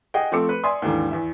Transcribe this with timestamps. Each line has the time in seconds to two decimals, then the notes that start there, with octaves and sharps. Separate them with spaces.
0.14 G#4 D#5 F#5 G5
0.32 F3 A3 C4 A4 D6 C#7
0.49 B4
0.63 D5 E5 G#5 C6 D#6
0.82 D#2 G#2 D3 E3
1.11 E2 E5